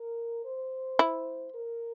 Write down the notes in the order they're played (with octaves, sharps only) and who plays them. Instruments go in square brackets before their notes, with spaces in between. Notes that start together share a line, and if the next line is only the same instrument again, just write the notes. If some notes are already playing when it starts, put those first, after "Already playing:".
Already playing: [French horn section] A#4
C5
[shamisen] E4
[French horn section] A#4